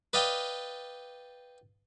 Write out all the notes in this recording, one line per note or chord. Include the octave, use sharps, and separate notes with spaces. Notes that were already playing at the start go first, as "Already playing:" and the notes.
B4 D5 D#5 F5 G5